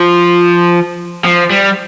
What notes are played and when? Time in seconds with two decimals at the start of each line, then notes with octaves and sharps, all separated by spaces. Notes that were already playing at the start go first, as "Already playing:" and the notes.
Already playing: F3
1.24 F3
1.50 G3